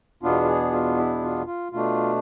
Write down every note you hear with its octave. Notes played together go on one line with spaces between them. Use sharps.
E2 B2 B3 D4 F4
F4
G#4
F4
E4
F4
F4
B2 A3 D4 F4